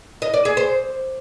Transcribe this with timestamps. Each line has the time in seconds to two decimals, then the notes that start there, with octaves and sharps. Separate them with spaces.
0.22 D#5
0.34 D5
0.45 G#4
0.57 C5